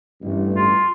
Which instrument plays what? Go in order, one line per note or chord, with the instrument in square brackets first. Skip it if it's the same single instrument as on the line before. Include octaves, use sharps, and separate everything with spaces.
[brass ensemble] A1 G2
[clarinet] F4